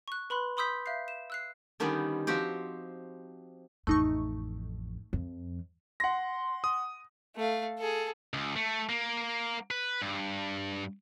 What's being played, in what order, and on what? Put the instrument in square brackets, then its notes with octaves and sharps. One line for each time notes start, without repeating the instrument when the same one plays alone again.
[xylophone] C#6 F#6
B4 B5 C6 F#6
B5 C6 D#6 E6 G6 B6
E5 F5 F#6 G6 C7
E7
E6 F#6 C7
[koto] D3 D#3 G3 B3 C#4 D#4
F3 C4 F#4 G4
[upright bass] A1 F2 [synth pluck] A3 D#4 C#6
[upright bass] F2
[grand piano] F#5 A#6 [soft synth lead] C6
[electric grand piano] D#6
[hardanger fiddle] A3 F5
G#4 A4
[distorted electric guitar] C#2
A3
A#3
B4
G2